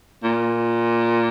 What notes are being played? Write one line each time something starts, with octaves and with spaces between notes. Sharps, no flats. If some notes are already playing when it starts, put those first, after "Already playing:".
A#2